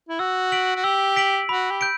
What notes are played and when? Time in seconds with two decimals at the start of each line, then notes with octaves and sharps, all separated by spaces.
0.09 E4
0.19 F#4 E6
0.52 B6 D7 F#7
0.76 F#4
0.84 G4 E6
1.16 B6 D7 F#7
1.49 F#4 B5
1.71 G4
1.81 G6 D7